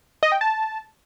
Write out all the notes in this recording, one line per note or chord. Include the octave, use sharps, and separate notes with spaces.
D#5
G5
A5